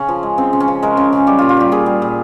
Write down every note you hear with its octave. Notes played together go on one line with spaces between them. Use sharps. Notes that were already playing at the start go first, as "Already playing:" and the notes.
Already playing: C#3 C#4
F3
G#3
C#3 C4
C#3
C#4
F3
G#3 A#4
C#3
C#3
G3 G4
A#2 F4
F4
G3 G4
A#2 G#4
G3
A#2